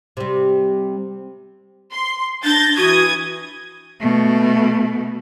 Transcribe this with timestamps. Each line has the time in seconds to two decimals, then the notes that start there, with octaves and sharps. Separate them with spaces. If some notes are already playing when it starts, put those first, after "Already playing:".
0.17 C3 G3
1.91 C6
2.44 D4 G6 A6 A#6
2.77 E3 F#4 D#6 G#6
4.00 B2 A3